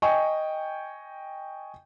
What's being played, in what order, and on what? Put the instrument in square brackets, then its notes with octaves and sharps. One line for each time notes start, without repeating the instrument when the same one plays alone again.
[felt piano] D#5 G5 G#5 C#6